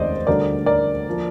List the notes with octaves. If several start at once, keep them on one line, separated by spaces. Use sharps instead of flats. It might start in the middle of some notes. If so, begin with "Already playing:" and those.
Already playing: F1 D#2 D#3 G#3 C4 C5 D5 D#5
D2 D3 G3 D4 A#4 D5
A#4 D5
F3 A#3